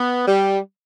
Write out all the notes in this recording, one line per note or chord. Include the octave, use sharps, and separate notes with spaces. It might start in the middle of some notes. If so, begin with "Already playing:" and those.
Already playing: B3
G3